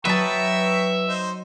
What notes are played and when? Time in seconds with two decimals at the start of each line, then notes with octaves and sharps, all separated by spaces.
0.05 F#3 B4 D#5 E5 G5 A5 A#5 C#6
1.08 D#4 C5